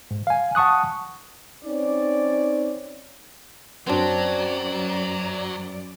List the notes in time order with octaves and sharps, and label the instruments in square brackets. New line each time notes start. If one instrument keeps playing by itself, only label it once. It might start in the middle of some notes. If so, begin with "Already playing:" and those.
[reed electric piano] G#2
F5 G#5
F#5 A5 C#6 D#6 F#6
[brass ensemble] C4 C#4 D#4 D5
[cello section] F#2 D5 [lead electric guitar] F#3 [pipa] C4 D4 [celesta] F#4 C5 G5